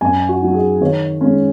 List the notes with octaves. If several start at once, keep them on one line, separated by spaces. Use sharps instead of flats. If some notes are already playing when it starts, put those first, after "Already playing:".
F#2 G#5
F#4
F#3 D#4
G#4
D#3 C#5
G#3 C#4